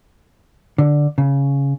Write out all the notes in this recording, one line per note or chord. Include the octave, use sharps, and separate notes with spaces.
D3
C#3